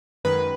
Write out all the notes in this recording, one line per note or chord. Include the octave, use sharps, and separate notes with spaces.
F#2 D#3 G#3 B4